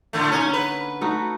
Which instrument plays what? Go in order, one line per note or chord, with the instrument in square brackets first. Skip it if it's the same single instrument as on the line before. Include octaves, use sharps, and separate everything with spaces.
[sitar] A2 D3 A3
[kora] D3 A#3 D#4 [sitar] C#4
[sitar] B4
[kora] A3 D#4 F#4